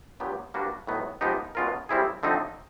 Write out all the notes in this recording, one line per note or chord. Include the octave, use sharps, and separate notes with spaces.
A#2 F#3 B3 D4 G4
G3 A#3 D4 F#4 B4
A2 F#3 B3 D#4
F3 G#3 B3 D#4 G4
B2 G#3 C#4 F4 A#4
G3 C4 E4 G#4
D3 F3 A3 C4 D#4